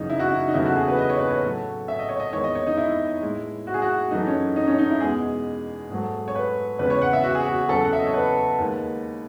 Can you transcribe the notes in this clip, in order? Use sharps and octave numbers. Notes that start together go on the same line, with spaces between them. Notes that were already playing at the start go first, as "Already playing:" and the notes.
Already playing: F#2 C#3 E3 D#4
E4
F#4
E4
D#4
E2 C#3 F#3 A3 E4
F#4
G#4
B4
D#5
C#5
B4
C#5
A2 F#3 A3
E5
D#5
C#5
D#5
E2 D#3 G#3 C#5
D#5
C#5
D#4
E4
A2 G#3
F#4
G#4
F#4
F#2 E3 A3 D#4
C#4
D#4
C#4
D#4
E4
E2 B2 G#3 G#4
G#2 F#3 A3
C#5
B4
E2 C#3 G#3 B4
C#5
F#5
E5
F#4
G#4
F#4
E2 C#3 F#3 A4
F#5
E5
D#5
C#5
B4
D#2 D#3 G#3